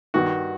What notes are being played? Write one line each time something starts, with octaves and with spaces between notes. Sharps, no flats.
G2 D#3 F#4